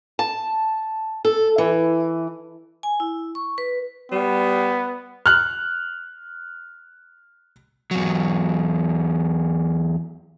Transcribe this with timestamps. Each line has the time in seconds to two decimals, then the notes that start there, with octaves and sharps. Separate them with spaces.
0.19 A5
1.25 A4
1.58 E3
2.83 G#5
3.00 E4
3.35 C#6
3.58 B4
4.12 G3 B3
5.26 F6 F#6
7.91 E2 F#3